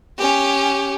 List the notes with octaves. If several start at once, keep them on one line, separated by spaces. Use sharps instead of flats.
C#4 G4